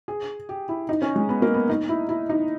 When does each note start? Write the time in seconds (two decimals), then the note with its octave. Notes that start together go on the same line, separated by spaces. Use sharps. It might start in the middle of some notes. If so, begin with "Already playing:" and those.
0.08 G#4
0.49 G4
0.69 E4
0.89 D#4
1.02 C#4
1.16 G#3
1.29 B3
1.42 A#3
1.54 B3
1.69 D#4
1.89 E4
2.09 E4
2.29 D#4